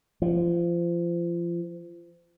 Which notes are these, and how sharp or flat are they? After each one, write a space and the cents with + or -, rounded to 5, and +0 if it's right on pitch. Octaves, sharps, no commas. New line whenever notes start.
F3 -30